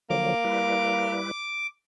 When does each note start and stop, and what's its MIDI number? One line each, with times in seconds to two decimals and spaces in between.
0.10 0.34 50
0.10 0.34 53
0.10 0.34 54
0.10 1.18 58
0.10 1.67 86
0.45 1.31 55
0.45 1.31 64
0.45 1.31 71